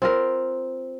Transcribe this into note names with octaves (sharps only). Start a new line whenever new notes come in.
C4 F4 A#4